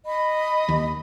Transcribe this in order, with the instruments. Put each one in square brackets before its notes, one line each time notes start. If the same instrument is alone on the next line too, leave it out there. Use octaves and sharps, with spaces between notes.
[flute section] D#5 B5
[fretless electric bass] D#2